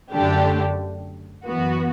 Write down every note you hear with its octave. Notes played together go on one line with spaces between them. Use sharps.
F#2 D3 A3 D4 G4
F#2 E3 B3 F#4